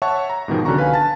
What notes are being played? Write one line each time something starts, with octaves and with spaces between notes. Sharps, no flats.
C#5 E5 F#5 A5 C#6
A#5
G#2 B2 D#3 F3
C2 D3 C#4 F#4 A#5 C#6
B4 F5 G#5
A5 A6